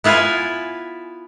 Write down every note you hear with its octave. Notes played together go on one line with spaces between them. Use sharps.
B3 E4 F4 B4 G#5